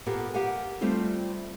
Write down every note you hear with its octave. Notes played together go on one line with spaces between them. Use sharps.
A#2 B3 F4 G4 A4 A#4
G4 A#4 F5 F#5 G#5
G3 A3 C4 F4 A4